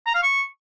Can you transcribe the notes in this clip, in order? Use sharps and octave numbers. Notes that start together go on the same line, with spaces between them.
A#5
F5
C#6